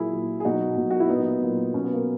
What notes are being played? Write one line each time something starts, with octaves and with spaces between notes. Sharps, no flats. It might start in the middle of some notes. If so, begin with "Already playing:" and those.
Already playing: A#2 F#3 E4 G#4
A#2 F#3
G#4
B2 F#3 D#4 F#4
B2 F#3
F#4
E4
A#2 F#3 B3 D#4
A#2 F#3
B2 F#3 C#4
B3
A#3